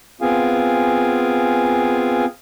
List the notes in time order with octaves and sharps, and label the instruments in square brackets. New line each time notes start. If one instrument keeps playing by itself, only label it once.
[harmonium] B3 C4 F4 G#4 F5 G#5